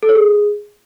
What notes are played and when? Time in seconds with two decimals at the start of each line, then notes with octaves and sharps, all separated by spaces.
0.03 A4
0.09 C#5
0.15 G#4